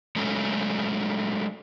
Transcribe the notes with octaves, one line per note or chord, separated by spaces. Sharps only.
F#3 G#3 A3 C#4